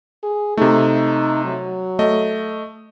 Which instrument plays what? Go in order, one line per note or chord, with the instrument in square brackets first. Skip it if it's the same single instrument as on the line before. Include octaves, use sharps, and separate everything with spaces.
[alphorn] G#4
[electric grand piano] C3 A3 [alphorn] D#4
[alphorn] F#3
[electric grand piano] A3 D#5